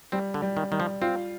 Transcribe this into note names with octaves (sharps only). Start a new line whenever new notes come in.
G3 C4
D3
G3
D#3
D#3 G3
F3
C4 F4